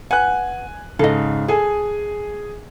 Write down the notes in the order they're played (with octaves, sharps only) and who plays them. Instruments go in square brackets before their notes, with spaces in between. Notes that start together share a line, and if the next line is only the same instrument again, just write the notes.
[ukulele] B4 F#5 [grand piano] G#5 F#6
[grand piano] G#2 C#3 [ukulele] A4 D#5
[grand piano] G#4 G#5 [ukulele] A4